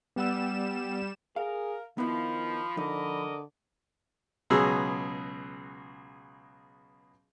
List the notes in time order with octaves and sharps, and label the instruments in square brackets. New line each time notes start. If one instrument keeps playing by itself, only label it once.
[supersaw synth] G3 E7 [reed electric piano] B3 F#5 E6
[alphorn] G#4 [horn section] A#4 [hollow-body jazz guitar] F5
[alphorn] D#3 [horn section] F3 [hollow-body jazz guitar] B3 E4 [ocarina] B5
[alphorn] D3 [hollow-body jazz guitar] F3 D#4 [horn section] A#4 D5 D#5
[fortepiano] C#2 B2 F#3 G#4 E6